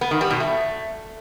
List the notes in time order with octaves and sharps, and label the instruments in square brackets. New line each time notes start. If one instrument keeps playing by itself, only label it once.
[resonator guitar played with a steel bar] B3
D#3
G3
B2
A3